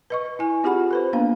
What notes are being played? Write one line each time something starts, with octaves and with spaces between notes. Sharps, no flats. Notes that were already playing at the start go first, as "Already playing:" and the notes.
B4 D#5 C#6
E4 G#5
C4 F4 G4 G#4 F#5 B5
A4 B4 C5
A#3 B3 D4 F5